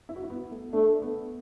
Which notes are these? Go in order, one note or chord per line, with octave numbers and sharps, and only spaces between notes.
E4
F#4
E4
B3
A3
A3 D4
B3